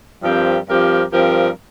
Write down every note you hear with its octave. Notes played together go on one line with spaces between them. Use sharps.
G2 F3 C4 G4 A#4
G2 F3 C4 G4 A#4
G2 F3 C4 G4 A#4